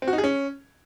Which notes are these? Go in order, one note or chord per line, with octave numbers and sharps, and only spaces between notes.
C4
F#4
D#4
G#4
C#4